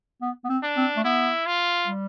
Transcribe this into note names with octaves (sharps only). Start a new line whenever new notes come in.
B3
B3
C4
D4
C4
A3
B3 E4
F4
G3